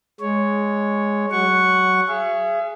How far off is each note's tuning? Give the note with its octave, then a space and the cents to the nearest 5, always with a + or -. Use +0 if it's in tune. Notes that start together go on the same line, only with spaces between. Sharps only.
G#3 +0 C#5 +0
F#3 +20 F#5 +0 C#6 +0
G#4 +5 E5 +45